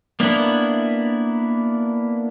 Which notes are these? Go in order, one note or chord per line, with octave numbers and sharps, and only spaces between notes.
A#3 B3 D4 E4